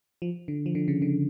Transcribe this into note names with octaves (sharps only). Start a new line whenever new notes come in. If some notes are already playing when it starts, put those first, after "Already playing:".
F3
D3
F3
D3
C#3
D3